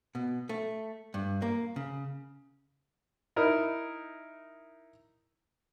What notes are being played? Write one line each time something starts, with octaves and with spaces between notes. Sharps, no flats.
B2
A3
G2
A#3
C#3
D#4 E4 A#4